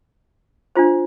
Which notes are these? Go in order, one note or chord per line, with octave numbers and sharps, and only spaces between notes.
D4 F4 C5